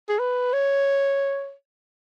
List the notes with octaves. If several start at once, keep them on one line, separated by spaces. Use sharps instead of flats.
G#4
B4
C#5